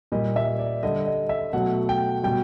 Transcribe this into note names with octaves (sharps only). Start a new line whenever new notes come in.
A#2 G3 D#5
E5
D5
D3 G3 D#5
D#5
E5
B2 F#3 A3 F#5
G5
B2 G3 G5